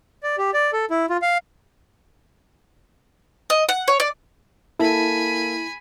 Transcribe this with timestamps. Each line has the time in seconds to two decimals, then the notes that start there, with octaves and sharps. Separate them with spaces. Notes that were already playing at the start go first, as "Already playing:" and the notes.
0.23 D5
0.38 G4
0.54 D5
0.73 A4
0.90 E4
1.10 F4
1.22 F5
3.50 D#5
3.69 F#5
3.88 C#5
4.00 D5
4.79 A#3 E4 A4 G#5 B5